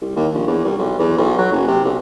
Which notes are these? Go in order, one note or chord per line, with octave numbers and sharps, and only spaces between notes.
C2
D#2
A#1
E2
C2
B1
E2
B1
F#3
F#1
C3
B1